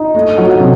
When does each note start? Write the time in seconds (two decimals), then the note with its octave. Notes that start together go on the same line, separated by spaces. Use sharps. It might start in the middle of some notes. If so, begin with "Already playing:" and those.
Already playing: D#4
0.15 A3
0.38 F#3
0.60 C3